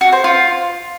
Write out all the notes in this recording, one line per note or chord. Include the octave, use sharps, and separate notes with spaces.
F#4
C5
F4